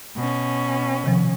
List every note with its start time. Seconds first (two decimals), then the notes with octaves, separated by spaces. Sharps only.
0.17 B2 C#4
1.04 C3 D#3 F3